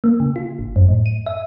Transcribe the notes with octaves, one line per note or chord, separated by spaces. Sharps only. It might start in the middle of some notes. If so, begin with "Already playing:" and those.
A#3
C#3
F4
G#1
F#2
A2
D#7
E5